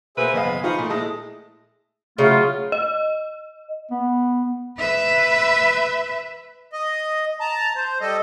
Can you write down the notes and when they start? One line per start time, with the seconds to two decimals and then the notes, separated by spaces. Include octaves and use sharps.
0.17 B2 A#3 G#4 B4 C5 E5
0.34 F#1 B3 D#5 F5 G#5 B5
0.64 F3 D#4 F4 B5 C#6 D#6
0.79 A#2 A3
0.90 G#3 E4 A5 D#6
2.18 C#3 F#3 A3 F4
2.72 D#5
3.91 B3
4.78 B4 E5
6.73 D#5
7.40 A5 A#5
7.76 C5
8.01 G3 A4 D#5